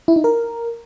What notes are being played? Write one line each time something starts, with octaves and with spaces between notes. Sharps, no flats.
E4
D#4
A#4